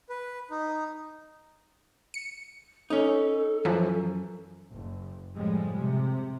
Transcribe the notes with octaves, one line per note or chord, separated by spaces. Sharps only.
B4
D#4
C#7
C#4 D#4 A4
F#2 E3 F3
F#1
A2 C#3 F3 G3 G#3
C3